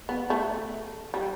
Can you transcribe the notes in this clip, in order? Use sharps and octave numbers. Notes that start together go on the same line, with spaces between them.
B3
A3
G3